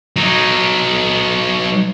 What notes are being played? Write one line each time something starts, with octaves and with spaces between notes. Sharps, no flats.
F#3 D#4